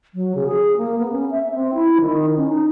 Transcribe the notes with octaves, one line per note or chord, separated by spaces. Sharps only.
F#3
C#3
G#4
A#3
B3
C#4
E5
C4
E4
D#3
C#4
D#4